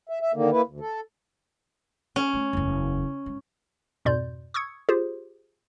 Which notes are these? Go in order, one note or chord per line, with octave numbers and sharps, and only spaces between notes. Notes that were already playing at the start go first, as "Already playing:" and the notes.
E5
E5
D3 D#3 A#3
A#3 E4 B4
D2
A4
C#4
A3
F#1 E2
G#2
F2 G#2 B2 D5 C6 G6
C#6 D#6 E6 G#6 C#7
F4 G4 G#4 C5